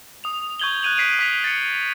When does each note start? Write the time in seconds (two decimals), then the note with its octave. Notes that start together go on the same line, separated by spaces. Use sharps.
0.24 D#6 F7
0.59 C#6 G6 G#6 F#7 G7
0.82 F#6 G#6 D#7 F7 F#7
0.97 F#6 B6 C7 D7 D#7
1.19 D#6 B6 F7
1.44 A6 C#7